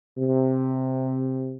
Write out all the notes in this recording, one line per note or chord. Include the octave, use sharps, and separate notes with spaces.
C3